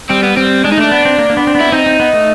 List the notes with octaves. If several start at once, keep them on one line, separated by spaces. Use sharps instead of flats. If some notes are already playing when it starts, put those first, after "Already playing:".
G3 C4
B3
G3 C4
G#3 D4
D#4
A3 D4
B3
C4
A#3
A#3
B3
C4
B3
E4
C4 D#4
C4
B3
A3